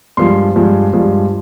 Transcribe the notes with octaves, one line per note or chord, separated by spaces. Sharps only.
G2 F3 G#3 C6
G2 F3 G#3
G2 F3 G#3